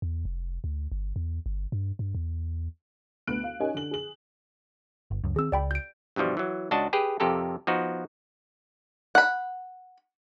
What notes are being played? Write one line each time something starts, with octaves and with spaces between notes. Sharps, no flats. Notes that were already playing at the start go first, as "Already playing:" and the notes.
E2
F1
D2
G1
E2
G1
G2
G2
E2
D2 B3 F#6 D7
F5
C#4 D#4 G4 A#4 D#5 G#5
D3 F#7
G#4 F#7
G1
C#2 F#2
D#3 C4 G#4 E6
C#2 D5 G5 B5
G6 D7
G2 B2 E3 F3 G3
E3 F#3
C#2 D4 F#4 D#5 A5
G4 G#4 B4 G5
F2 C3 G4 A4 A#4
F3 B3 D#4 F#4
F#5 B5